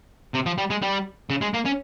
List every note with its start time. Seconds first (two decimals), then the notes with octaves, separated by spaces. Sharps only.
0.34 C3
0.46 F3
0.58 G3
0.70 G#3
0.82 G3
1.30 C#3
1.41 G#3
1.54 A#3
1.65 C#4